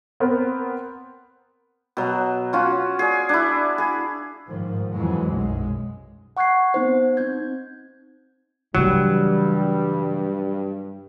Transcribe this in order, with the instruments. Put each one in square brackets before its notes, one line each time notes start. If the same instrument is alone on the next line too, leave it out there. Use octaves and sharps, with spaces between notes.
[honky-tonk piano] B3 C4 A#4 C5
[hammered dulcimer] B2 F#3
C#4 F4 F#4
G#4 D5
D4 E4
G#4
[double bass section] G#2 D#3 F3
F2 E3 F#3 G#3
B1 F#2 G#3
[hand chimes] F#5 C#6 F#6 G#6 C7
B3 C4 D#4 C5
C4 D#4 G6 G#6
[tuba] G2 [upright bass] C#3 E3 [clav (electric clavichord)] F#3 [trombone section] G3